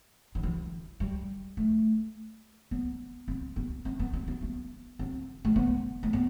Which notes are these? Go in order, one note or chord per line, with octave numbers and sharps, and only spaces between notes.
D#3
E3
G3
A3
B3
C4
B3
C4
B3
C4
B3
B3
C4
A3
B3
A3
B3